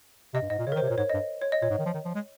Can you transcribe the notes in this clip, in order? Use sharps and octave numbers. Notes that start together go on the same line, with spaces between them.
C3 D#5
G2
G#2 D#5
A#2
C#3 C#5
A#4
D#3
C5
C3
C#5
A#2
G#2 C#5
D#5
G2
C#5
D#5
A#2 C#5
G#2
D#3
F3
D#3
F3
G#3